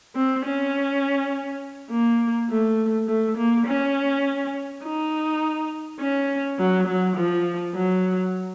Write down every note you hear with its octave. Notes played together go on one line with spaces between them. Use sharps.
C4
C#4
A#3
A3
A3
A#3
C#4
D#4
C#4
F#3
F#3
F3
F#3